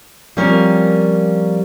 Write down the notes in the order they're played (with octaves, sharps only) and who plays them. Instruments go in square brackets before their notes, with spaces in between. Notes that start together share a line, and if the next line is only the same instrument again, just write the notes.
[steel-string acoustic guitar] F3 G3 A#3 C4 C#4 A#4